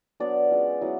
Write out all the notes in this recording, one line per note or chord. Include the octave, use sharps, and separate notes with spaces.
F#3 B3 D4 D5
G#3 C#4 F4
F#3 B3 E4